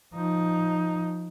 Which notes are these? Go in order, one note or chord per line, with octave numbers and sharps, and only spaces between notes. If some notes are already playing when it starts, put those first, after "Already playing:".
F3 D#4